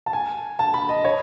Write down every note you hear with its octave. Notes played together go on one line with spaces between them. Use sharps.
A5
G#5
A5
B5
D#5
C#5